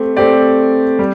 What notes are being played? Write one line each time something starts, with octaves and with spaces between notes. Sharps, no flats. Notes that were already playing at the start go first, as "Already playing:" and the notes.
Already playing: A3 C4 G4
A3 C4 G4 D5
G3